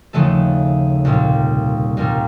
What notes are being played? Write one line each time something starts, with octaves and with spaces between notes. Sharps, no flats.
D#2 C#3 F3 A3 A4
C2 A#2 G3
C2 A#2 G3 A#4